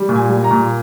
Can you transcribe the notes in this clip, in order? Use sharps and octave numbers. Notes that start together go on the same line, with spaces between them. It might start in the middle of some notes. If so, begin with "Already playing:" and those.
Already playing: G3
A#2
G#5
G3
A#5
A#2